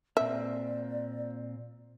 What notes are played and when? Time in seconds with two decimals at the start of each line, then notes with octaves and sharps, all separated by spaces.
0.17 A#2 C4 D5 E5